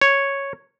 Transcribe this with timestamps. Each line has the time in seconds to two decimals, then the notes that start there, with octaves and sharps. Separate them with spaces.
0.02 C#5